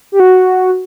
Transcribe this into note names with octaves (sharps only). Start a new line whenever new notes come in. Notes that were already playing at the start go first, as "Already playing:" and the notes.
G4
F#4